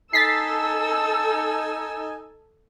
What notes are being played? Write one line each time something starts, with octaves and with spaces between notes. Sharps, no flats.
D#4 A4 G#5 E6 A6 B6 C7